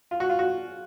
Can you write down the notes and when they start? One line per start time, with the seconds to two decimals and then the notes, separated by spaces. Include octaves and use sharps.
0.11 F4
0.20 F#4
0.30 F4
0.39 F#4